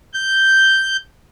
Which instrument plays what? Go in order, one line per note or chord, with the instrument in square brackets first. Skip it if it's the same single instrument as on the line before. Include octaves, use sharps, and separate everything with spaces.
[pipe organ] G6